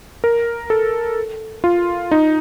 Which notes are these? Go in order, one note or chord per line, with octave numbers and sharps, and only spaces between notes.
A#4
A4
F4
D#4